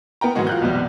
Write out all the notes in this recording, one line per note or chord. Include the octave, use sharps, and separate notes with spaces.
B3 A#4 G5 A#5
G#2 D#3 E3 F#3 G#3 F#4
F4 F#6 G6
B1 E2 C3 G3